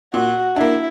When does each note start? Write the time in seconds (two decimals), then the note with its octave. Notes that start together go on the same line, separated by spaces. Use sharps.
0.14 A#2 F#4
0.56 A#3 D4 E4